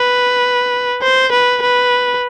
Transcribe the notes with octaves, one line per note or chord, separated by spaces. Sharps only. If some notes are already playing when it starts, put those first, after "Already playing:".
Already playing: B4
C5
B4
B4